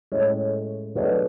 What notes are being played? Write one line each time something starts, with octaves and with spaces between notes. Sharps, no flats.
A2 G#3 C#4
B2 F#3 A3 D4 G#4